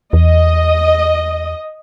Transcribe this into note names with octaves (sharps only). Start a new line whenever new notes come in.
E2 D#5